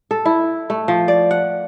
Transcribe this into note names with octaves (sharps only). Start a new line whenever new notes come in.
A4
E4
A3
F3
D5
F#5